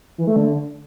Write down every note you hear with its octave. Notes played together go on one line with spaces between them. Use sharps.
E3
A3
D3